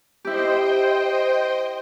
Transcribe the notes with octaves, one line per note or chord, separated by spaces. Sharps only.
E4 G4 C5 D#5 G5